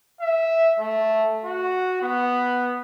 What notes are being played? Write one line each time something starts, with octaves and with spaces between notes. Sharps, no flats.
E5
A3
F#4
B3